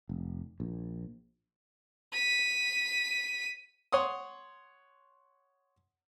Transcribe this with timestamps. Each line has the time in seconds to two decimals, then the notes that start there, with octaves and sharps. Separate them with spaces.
0.09 F1
0.60 A#1
2.13 B6 D#7
3.92 C#5 F#5 C6 D#6